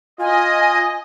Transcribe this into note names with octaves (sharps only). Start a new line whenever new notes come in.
F4 D#5 G#5